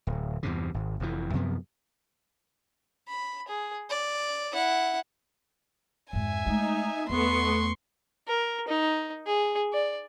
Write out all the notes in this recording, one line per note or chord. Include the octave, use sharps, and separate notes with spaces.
D1
E2 G2 C3
G#1
F1 F2 E3
F#2 C3 F3 B3
B5
G#4
D5
E4 F#5
F2 G#2 E5 G#5
G#3 A3 D#4
E2 A3 B3 C6 C#6
A#4
D#4
G#4
D5